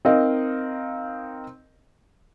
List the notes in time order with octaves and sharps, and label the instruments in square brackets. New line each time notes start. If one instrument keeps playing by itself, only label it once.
[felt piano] C4 D#4 A#4 D#5 F5